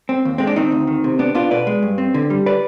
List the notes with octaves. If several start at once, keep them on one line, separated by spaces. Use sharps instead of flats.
C4
D#2
G#3 C4
D4
D#3 C4 D#4
D2
D#3
C3
B3 D4
B3 D4 F4
B2 B4 D5
G#3
G2
C4
D3
G3
B4 D5